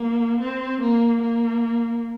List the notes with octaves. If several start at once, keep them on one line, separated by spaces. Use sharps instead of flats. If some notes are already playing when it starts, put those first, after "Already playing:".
Already playing: A#3
C4
A#3
A#3